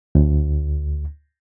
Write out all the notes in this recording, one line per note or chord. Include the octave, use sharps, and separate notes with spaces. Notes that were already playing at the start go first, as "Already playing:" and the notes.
D2